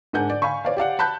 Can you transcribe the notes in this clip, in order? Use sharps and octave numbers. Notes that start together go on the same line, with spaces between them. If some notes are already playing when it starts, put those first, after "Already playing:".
G#2 D4 A#4 F#5 G#5 G6
D5
F5 G#5 B5 C#6
C#5 D5 F5
G4 D5 F5 F#5
A5 B5 F#6 G6